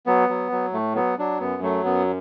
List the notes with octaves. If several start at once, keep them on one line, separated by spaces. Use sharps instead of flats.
F#3 B3
F#3
F#3
A2 A3
F#3 B3
F#3 D4
F#2 B3
F#3 A3
F#2 B3